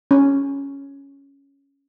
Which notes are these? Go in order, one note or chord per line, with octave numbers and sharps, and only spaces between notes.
C#4